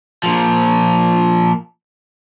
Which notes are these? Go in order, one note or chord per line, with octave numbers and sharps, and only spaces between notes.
A#2 F3